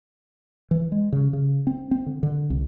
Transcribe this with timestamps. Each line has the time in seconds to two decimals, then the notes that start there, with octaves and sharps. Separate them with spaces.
0.71 E3
0.92 G#3
1.13 C#3
1.33 C#3
1.67 C4
1.91 C4
2.06 D3
2.23 D3
2.50 C2